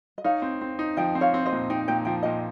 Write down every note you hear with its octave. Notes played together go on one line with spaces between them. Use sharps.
D#5
D#4 C#5 F5
C4
C4
D#4
F3 D#5 G5
C4
C#5 F5
C4
C5 D#5
A#2
D#4 G5
A#2 G5
F3 G5
A#2 D#5 G5